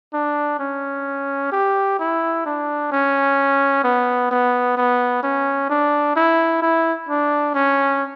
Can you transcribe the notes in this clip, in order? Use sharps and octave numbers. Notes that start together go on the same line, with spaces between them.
D4
C#4
G4
E4
D4
C#4
B3
B3
B3
C#4
D4
E4
E4
D4
C#4